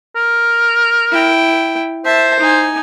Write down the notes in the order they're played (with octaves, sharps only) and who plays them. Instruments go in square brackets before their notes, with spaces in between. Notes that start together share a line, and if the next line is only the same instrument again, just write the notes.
[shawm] A#4
[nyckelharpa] E4 G5
[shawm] C5 [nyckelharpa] E5 A5
[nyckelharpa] D#4 G#5